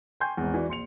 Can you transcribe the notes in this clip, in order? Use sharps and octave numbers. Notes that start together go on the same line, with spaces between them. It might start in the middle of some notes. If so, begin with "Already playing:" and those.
G5 G#5 C6 C#6 G6
G#1 E2
E3 F#4 D5
A#1 C6 C#7 F7